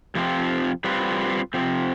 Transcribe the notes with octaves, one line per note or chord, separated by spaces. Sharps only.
F2 C3 F3 C4
G3 C4 F4 B4
C3 F3 C4